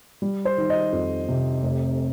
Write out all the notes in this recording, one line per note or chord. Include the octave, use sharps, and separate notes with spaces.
G3
C5
D#3
D#5
F2
C3
F1